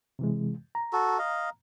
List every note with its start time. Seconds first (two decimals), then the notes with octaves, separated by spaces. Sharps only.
0.19 C3 E3 G#3
0.75 A#5
0.93 F#4 A4
1.19 D#5 F5